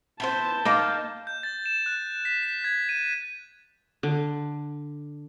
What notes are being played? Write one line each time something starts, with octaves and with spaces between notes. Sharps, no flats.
B3 E4 C5 A5 G6
A#3 D#4 F5
G6
A6
E7
F#6
B6
B6
G#6
D#7
D3